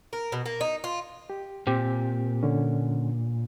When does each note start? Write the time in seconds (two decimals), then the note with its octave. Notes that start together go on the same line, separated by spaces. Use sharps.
0.13 A#4
0.32 B2
0.46 A#3
0.61 D#4
0.84 F4
1.30 G4
1.67 A#2 C4 G4
2.43 D3 C#4